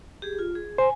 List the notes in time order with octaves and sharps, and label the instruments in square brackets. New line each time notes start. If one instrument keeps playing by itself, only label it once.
[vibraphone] G4 G#4
F4
G#4
[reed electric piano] C5 [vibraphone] G#5